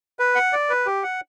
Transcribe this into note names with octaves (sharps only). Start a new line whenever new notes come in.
B4
F#5
D5
B4
G4
F#5